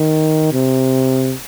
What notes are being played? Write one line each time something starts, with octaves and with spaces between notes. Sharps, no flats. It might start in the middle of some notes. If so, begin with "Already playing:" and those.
Already playing: D#3
C3